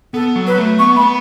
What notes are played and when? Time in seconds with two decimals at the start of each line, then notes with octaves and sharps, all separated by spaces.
0.14 B3 A4
0.35 F#3
0.47 B4
0.58 A3
0.79 B3 C#6
0.96 A3 B5
1.01 B3